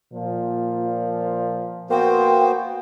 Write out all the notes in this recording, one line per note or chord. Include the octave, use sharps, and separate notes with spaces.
A#2 F3
A#3 B3 F#4 C5 G5